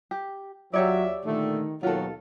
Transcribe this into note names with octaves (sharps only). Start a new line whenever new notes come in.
G4
D#2 F#3 F4 G4 C#5 D5 E5
A#2 D3 D#3 A3
D#2 B2 D#3 F#3 F4 A4